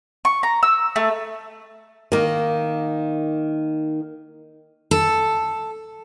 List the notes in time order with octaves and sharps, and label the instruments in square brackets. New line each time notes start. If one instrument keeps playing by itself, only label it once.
[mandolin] C#6
A#5
E6
A3
[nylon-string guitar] D#3 A#3
[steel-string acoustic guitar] A4